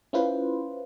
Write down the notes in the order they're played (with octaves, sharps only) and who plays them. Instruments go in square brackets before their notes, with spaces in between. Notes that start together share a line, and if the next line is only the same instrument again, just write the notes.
[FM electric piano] C#4 E4 F4 B4 C5